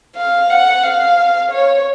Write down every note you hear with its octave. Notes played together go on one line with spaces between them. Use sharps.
F5
F#5
F5
C#5